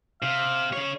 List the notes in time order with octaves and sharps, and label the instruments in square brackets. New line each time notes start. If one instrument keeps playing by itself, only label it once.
[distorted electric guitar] C3 [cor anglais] F5
[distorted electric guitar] C#3 C#5